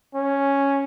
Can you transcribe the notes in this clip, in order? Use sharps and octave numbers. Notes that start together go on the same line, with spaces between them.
C#4